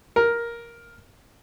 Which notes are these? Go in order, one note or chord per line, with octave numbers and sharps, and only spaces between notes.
A#4